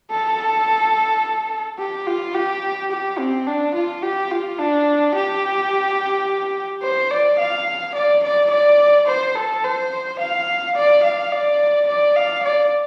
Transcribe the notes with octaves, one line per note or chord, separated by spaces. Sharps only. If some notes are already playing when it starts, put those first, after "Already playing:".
A4
G4
F4
G4
G4
C4
D4
F4
G4
F4
D4
G4
C5
D5
F5
D5
D5
D5
C5
A4
C5
F5
D5
F5
D5
D5
F5
D5